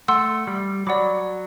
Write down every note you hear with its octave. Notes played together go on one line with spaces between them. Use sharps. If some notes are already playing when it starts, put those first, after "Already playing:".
A3 F#5 C6 E6
G3
F#3 D5 F#5 B5 D6